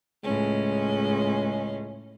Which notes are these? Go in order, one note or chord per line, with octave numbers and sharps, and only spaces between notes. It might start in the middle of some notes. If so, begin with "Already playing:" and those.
C#2 A2 G#3 C#4